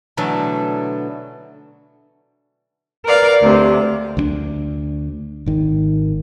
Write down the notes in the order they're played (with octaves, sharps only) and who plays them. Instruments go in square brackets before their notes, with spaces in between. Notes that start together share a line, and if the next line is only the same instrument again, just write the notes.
[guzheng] B2 D3 E3 F#3 A3
[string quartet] A#4 B4 D5 F5
D2 C3
[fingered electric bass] D2 G#3 D4
G#1 D#3